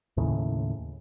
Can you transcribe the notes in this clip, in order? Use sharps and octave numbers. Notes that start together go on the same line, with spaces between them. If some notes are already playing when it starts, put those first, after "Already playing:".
D#2 A2 C#3